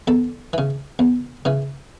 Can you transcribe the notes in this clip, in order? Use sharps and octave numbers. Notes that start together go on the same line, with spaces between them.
E2 A4
C#3 E3
E2
C#3 E3